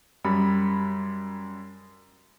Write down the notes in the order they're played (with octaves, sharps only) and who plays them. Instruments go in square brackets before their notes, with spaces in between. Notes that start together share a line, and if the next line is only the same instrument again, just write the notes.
[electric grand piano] F#2 G3 B5